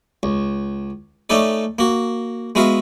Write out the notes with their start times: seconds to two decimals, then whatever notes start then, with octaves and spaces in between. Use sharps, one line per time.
0.23 C#2
1.30 A3 C#4 D#4 A4 D5
1.79 A#3 F#4
2.55 G#3 B3 F#4 E5 F5